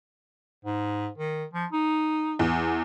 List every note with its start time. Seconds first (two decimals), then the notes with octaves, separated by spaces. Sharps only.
0.65 G#2
1.18 D#3
1.53 F3
1.72 D#4
2.39 E2